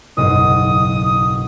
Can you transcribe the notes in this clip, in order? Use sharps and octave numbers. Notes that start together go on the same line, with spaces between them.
F#1 B1 G#2 D#6